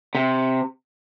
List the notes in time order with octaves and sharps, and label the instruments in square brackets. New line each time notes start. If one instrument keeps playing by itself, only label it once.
[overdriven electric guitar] C3